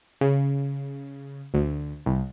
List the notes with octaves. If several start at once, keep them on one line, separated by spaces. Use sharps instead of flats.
C#3
D2
C2